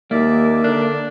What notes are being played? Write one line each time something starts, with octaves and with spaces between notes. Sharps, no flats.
D#2 A#3 D5 E5
D3 D4